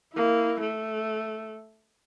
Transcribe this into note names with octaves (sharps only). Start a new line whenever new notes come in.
A#3 E4
A3